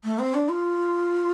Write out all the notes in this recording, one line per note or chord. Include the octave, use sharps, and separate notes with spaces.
A3
C4
D4
F4